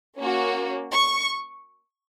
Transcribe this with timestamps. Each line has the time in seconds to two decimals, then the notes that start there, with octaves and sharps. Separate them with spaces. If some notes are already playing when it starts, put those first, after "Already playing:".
0.18 A#3 C#4 F#4
0.91 C#6